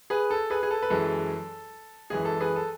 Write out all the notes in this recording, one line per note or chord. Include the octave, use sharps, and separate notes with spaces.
G#4 B4
A4
G#4 B4
G#4
A4
B4
F#2 E3 G#3 A4
F#2 E3 G#3 G#4
A4
G#4 B4
A4